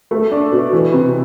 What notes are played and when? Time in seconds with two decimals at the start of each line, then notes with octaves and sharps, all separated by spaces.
0.11 A3
0.31 D4
0.52 B2
0.73 E3
0.92 C3